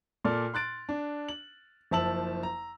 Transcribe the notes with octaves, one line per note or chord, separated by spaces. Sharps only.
A#2 A4 D5 F6
C6 F#6 A6 D7
D4
F#7
F#1 F3 E5 A5 E6 F#7
A#5